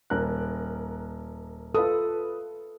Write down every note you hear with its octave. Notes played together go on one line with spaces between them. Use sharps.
D#1 A#4 F#6
F4 A4 B4 D#6